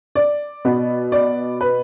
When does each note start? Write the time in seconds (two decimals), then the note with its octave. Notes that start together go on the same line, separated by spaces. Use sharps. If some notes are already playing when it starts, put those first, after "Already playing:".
0.15 D5
0.65 B2 B3
1.12 D5
1.61 B4